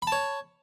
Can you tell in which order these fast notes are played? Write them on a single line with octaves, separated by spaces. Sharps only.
B5 A5 C#5